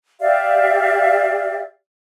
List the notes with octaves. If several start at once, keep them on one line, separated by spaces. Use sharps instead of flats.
G4 D5 E5 F5